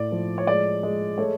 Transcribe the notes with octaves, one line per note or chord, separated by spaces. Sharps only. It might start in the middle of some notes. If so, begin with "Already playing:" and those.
Already playing: A2 D5
F3
C#5
G#3 D5
G#3
A3 C#5